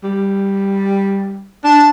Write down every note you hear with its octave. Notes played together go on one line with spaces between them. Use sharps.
G3
D4 A5